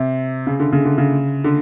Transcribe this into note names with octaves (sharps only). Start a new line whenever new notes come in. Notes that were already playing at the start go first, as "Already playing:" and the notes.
Already playing: C3
C#3
D3
C#3
D3
C#3
D3